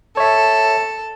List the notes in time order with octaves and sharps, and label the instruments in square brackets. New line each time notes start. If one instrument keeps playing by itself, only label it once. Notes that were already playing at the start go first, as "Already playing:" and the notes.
[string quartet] A4 [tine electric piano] C#5 E5